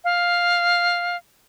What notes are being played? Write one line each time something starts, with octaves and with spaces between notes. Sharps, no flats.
F5